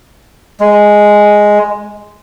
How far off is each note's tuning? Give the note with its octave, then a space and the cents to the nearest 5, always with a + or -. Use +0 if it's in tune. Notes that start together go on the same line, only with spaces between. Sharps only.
G#3 +0